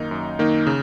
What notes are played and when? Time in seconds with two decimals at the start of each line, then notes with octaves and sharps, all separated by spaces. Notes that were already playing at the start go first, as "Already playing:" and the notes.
Already playing: F#2 D#3 A#3 D#4
0.11 F#2
0.39 D#3 A#3 D#4
0.67 C#3